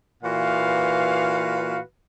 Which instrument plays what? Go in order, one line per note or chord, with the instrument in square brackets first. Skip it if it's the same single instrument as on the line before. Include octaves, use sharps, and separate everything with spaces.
[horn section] A#2 E3 F#4 B4 F5